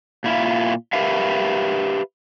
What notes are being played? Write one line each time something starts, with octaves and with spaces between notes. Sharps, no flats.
A#2 E4 F4
G4 A#4 B4 E5 F5